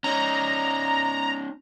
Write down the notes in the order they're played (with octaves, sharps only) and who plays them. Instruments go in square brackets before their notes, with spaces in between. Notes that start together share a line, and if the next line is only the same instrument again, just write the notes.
[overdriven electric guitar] C#4 D#4 [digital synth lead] A#5